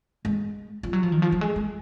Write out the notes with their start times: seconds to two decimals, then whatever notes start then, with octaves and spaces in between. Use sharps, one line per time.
0.25 G#3
0.83 F3
0.93 F#3
1.03 F3
1.12 D#3
1.22 F3
1.32 F#3
1.41 G#3
1.56 G#3